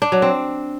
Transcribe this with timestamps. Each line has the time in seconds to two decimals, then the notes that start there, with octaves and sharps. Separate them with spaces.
0.02 D4
0.12 F#3
0.22 C4